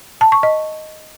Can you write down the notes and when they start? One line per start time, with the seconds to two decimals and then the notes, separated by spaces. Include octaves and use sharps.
0.21 A5
0.32 C#6
0.43 D#5